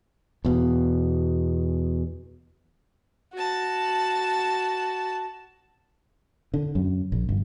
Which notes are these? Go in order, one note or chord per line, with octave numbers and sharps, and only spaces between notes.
E2 B2
F#4 A5
D3
F#2
A#1
G1